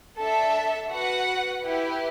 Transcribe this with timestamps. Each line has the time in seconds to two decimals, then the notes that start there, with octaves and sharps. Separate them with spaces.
0.18 D4 A4 E5 A5
0.90 F#4 B4 F#5
1.62 E4 G4 B4